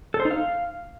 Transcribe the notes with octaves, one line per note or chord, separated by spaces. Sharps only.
A4
C5
D#4
F5